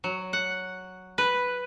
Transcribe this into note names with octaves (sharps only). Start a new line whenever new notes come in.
F#3
F#5
B4